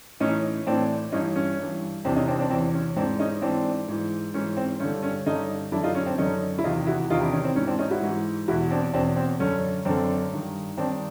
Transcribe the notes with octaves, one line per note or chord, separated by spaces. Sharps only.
A2 E3 C#4 D#4
A2 E3 C4 D4
G2 E3 C#4 D#4
C#4
G2 E3
E2 C3 E3 C4 D4
C#4 D#4
C4 D4
C4 D4
E2 C3 E3 C4
C#4
G#2 E3 C4 D4
C#4 D#4
G#2 E3 C4 D4
G#2 E3
G#2 E3 C#4
C4
G2 D3 C#4
C#4
G2 D3 C#4 D#4
F#2 D3 D4 E4
D#4 F4
C#4
C4 D4
F#2 D3 C#4 D#4
E4
E2 C3 D#3 D#4 F4
E4 F#4
E2 C3 D#3 D#4 F4
D4 E4
C#4 D#4
C4
G#2 E3 C#4
C4 D4
C#4 D#4
E4 F#4
G#2 E3
E2 B2 E4 F#4
C4 D4
E2 B2 C4 D4
C4
F#2 D3 C#4
F#2 D3 C4 D4
G2 D#3
G2 D#3 C4 D4